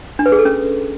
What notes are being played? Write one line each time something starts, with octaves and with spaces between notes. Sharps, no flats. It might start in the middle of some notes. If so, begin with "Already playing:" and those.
D4
B4
G#4
A4
C#4